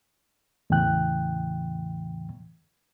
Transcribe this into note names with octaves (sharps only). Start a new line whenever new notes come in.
E2 A2 C#3 E3 G5 F#6